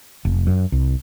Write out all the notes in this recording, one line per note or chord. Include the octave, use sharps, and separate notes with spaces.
F1
F#2
C2